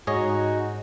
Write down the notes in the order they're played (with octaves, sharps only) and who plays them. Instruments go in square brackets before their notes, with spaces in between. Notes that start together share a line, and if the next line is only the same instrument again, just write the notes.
[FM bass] G#2 [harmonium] D#4 F#4 [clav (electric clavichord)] G#4 C#5 D#5